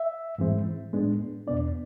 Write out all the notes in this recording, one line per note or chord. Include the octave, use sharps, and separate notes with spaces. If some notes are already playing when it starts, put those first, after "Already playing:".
Already playing: E5
G#2 E3 G#3 C4
A2 G#3 B3 D4
E2 B2 B3 D4 D5